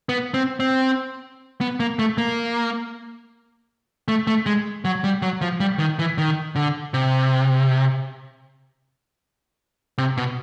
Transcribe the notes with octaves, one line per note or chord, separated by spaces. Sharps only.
B3
C4
C4
B3
A#3
A3
A#3
A3
A3
G#3
F#3
G3
F#3
F3
G3
D#3
E3
D#3
D3
C3
C3
B2